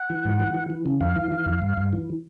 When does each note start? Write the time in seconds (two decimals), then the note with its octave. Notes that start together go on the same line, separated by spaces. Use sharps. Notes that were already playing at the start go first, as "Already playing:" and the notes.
Already playing: F#5
0.10 E3
0.25 G#2
0.39 E3
0.54 E3
0.70 E3
0.86 C#3
1.01 F2 F5
1.16 E3
1.32 E3
1.46 F2
1.62 G2
1.77 G2
1.93 E3